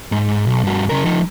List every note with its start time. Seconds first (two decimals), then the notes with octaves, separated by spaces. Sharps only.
0.12 G#2
0.47 B1
0.64 G2 F#4
0.90 C#3 A#4
1.05 F3 D#4